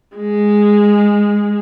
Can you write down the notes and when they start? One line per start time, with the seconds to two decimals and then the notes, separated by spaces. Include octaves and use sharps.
0.16 G#3